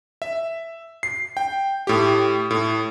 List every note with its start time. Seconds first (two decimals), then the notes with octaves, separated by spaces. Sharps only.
0.22 E5
1.03 C7
1.37 G5
1.87 A2 G4
2.51 A2